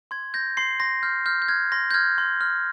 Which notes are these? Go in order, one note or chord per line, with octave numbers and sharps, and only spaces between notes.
C6 G#6
G6 A#6
C6 C7
C6 A#6
F6 G6
F6 G6
G6
F6 G#6
C6 A#6
G6
F6 G#6
C6
F6